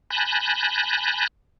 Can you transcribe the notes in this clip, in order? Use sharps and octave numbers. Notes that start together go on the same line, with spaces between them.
G#5 A5 B5 F#6 G6 A#6